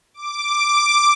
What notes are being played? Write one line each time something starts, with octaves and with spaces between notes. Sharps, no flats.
D6